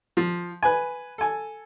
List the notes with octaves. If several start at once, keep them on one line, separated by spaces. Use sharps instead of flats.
F3
B4 G#5
A4 G#5